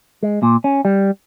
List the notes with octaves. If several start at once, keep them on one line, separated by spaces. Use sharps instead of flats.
G#3
A#2
C#4
G3